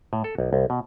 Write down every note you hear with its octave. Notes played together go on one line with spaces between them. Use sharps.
A2
A4
B1
C2
B2